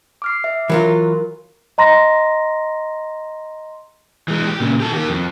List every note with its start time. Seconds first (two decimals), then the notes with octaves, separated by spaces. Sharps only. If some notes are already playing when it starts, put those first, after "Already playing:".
0.22 D6 F6 C7
0.44 E5
0.69 E3 F#3 F4 A#4
1.78 D#5 A#5 C6 A#6
4.28 E3 G#3
4.47 G4
4.60 A#2 C#3
4.80 G4 A4
4.92 D#3 G4
5.10 F2